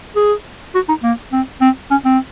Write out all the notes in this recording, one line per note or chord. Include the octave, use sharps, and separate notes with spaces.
G#4
F#4
D#4
A#3
C4
C4
C#4
C4